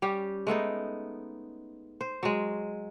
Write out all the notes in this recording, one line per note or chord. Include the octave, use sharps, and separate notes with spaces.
G3 C#4 G4
G#3 A3 B3 D#4
C5
F#3 G#3